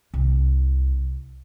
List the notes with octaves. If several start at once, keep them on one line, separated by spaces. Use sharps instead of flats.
C2